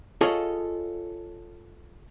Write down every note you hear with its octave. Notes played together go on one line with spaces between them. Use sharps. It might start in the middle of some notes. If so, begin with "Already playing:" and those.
F4 G#4 A4 C#5 D#5